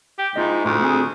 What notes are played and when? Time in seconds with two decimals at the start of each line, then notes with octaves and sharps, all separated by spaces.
0.19 G4
0.36 G#2 E4 F4 D#5
0.65 D2 A2 F4
0.82 C4 G#4 G#5